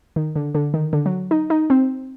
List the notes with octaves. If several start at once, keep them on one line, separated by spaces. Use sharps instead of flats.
D#3
D3
D3
D#3
D3
F#3
D#4
D#4
C4